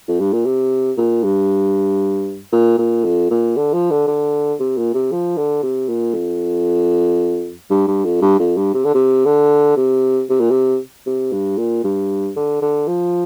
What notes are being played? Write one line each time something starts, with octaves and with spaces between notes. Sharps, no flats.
F2
G2
A#2
C3
A#2
G2
A#2
A#2
F2
A#2
D3
F3
D3
D3
C3
A#2
C3
F3
D3
C3
A#2
F2
G2
G2
F2
G2
F2
G2
C3
D3
C3
D3
C3
C3
A#2
C3
C3
G2
A#2
G2
D3
D3
F3